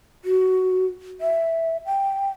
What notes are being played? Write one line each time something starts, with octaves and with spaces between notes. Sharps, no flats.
F#4
E5
G5